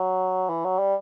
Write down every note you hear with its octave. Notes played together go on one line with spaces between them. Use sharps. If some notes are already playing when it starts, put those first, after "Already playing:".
Already playing: F#3
E3
F#3
G3